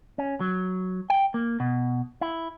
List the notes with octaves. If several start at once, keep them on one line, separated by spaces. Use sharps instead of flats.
C#4
F#3
G5
A#3
B2
E4